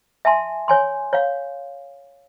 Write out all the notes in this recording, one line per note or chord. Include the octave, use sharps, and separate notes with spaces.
E5 G#5 A5 C6
C#5 G#5 C6
C#5 F5